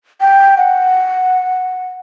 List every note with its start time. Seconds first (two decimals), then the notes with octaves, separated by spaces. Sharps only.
0.21 G5
0.57 F#5